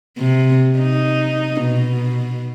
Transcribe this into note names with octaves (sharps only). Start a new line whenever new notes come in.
C3
D#4
B2